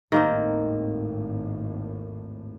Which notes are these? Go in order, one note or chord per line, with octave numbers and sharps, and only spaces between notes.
G#1 D#2 A2 D#3 A#3 C4